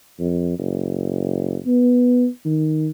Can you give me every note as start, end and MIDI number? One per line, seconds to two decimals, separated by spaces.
0.20 0.59 41
0.59 1.57 30
1.66 2.28 59
2.45 2.90 51